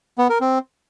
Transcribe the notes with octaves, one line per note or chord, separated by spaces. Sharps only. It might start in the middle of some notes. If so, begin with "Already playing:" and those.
B3
A#4
C4